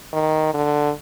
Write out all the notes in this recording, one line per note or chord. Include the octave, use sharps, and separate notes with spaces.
D#3
D3